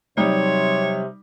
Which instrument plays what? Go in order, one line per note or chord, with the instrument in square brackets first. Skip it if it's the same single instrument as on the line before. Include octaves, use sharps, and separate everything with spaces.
[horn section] C3 [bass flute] F#3 [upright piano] G3 D#4 [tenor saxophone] C#5